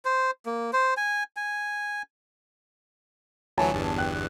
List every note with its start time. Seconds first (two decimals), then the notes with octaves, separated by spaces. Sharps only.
0.05 C5
0.46 A#3
0.73 C5
0.97 G#5
1.37 G#5
3.57 D2 E3 F#3 C#5 G#5 A5
3.72 G1 E2 G2
3.98 G5 F#6